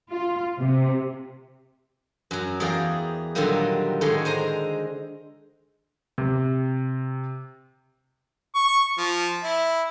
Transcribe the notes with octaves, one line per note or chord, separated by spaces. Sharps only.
F4
C3
F#2 F#3
E2 G#4 A#4 D5 F5 G5
A#2 D3 D#3 F#3 G3 A#3
A2 D3 D#3 G#3 G#4
C5 G#5 A#5
C3
C#6
F3
E4